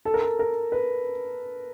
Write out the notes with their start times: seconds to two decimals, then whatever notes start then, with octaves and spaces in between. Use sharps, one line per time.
0.05 A4
0.14 A#4
0.22 A4
0.39 A#4
0.72 B4